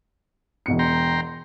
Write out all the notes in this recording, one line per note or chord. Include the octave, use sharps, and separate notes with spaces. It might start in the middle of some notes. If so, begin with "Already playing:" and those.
E1 B2 C#7
G5 A#5 C6